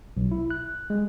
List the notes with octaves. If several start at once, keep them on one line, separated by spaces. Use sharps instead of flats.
B1
E4
F#6
G#3